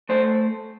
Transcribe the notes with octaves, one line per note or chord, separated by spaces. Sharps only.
A3 C5